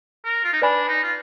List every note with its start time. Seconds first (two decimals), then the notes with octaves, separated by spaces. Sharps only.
0.24 A#4
0.44 F4
0.53 D#4
0.62 D4 B4 D5 G#5 B5
0.88 D#4
1.03 F4